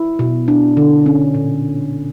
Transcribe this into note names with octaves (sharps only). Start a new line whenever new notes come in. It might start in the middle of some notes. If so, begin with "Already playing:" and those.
Already playing: E4
B2
D4
D3
C#4
A#2